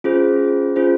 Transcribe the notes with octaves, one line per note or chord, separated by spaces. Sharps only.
C#4 F4 G#4 C5
C#4 F4 G#4 C5